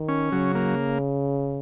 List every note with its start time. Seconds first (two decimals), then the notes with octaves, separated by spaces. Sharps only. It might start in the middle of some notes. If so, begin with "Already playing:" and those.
Already playing: D#3
0.08 C#4
0.32 C#3 F#3
0.55 A#3